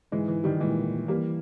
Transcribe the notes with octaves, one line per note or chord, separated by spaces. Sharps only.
G#2 E3 G#3
E3
D#3 G3
A#2 E3 G#3
E3 G3 A#3